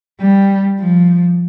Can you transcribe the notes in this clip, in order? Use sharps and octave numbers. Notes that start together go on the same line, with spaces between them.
G3
F3